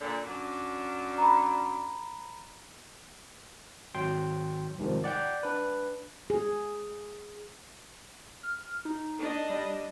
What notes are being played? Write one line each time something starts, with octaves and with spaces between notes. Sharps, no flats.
A#2 D3
F#2 D4
A#5 B5
G#1 F#3 G5 C6
C2 G#2 C3 D#3 F3
D5 F#5 G5 G6
D4 B4
G#4
F6
D#4
D4 D#5
G3